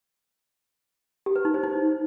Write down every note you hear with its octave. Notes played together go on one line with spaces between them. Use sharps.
G4
B4
D#4
C5
D#4